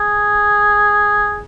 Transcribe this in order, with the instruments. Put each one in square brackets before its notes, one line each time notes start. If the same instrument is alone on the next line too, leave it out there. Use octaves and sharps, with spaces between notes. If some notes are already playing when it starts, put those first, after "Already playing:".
Already playing: [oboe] G#4